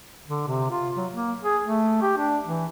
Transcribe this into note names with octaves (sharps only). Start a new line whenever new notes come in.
D3
C3
F4
F#3
A#3
G#4
A3
G4
D4
E3